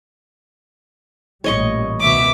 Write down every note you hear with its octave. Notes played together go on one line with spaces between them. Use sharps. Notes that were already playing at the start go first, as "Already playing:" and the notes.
A1 A#2 G3 C#5 D#5 C#6
C#2 B2 D#3 E5 D6